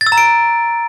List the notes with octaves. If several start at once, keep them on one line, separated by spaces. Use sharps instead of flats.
A6
E6
A#5
D7